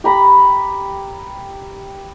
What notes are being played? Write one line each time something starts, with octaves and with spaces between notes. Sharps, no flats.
G4 A#5 B5